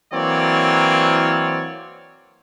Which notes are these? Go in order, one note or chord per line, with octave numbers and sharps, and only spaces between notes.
E3 F#3 A#3 C4 C#5 D5